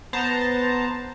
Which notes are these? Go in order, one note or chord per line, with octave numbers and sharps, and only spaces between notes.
B3 C5 A5 A#5